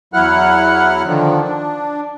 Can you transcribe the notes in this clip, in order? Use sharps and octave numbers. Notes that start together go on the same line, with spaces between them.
E2 F#3 E4 F#5 F6 F#6
D3 D#3 F3
D4